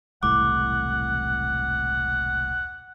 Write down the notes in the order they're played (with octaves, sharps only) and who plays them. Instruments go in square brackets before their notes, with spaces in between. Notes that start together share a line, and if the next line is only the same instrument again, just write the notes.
[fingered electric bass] E1 C2 A2 [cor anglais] F#5 [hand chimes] D6